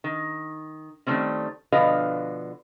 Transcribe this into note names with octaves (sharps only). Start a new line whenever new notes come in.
D#3
D#3 G3 A3 C4 C#4
B2 D3 F3 B4 D#5 F5